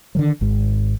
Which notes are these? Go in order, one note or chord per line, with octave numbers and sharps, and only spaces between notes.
D3 D#3 F#3
G#1 G#2